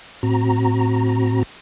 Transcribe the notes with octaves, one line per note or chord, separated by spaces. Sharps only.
A2 C4 F#4 A#5